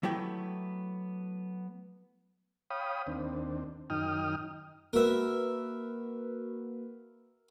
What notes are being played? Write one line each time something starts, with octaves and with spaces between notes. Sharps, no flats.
F#3 A3 B3 E4 G4 G5
C#5 F5 G5 B5 D#6
D#2 C4 D4
F#2 D#3 D#4 G5 D#6 F6
A#3 F#4 A#4 B4 E5